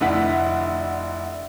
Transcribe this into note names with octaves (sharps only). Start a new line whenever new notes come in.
F1 D3 E4 F#5 B6